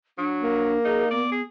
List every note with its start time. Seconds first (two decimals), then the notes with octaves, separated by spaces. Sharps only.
0.18 F#3 D4
0.42 A#3
0.85 D#4 G#4
1.11 B3 D5
1.32 G#4